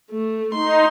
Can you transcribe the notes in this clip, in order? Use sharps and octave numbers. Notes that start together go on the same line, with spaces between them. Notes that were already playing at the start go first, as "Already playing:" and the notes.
A3
D#4 C6